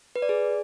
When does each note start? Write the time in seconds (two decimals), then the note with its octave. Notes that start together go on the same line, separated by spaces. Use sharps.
0.16 B4
0.22 D5
0.29 G#4